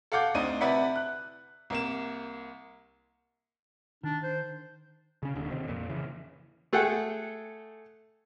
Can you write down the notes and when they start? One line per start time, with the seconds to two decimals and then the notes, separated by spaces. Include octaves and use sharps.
0.12 A4 F5 F#5 D6 G6
0.34 D2 C4 D4 D#4 D#7
0.61 C3 E4 B4 D5 E5 F#5
0.96 F#6
1.70 C2 A#3 E7
4.04 D#3 D4
4.23 C5
5.23 C#3 C#4
5.35 D#1 D#2 D3
5.51 C3 D#3
5.68 F2 A#2
5.89 C#3 E3
6.73 A3 G#4 A4 F#5 G5